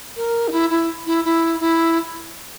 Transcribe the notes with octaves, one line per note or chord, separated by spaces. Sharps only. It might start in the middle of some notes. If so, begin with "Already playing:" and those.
A#4
D#4
E4
E4
E4
E4
E4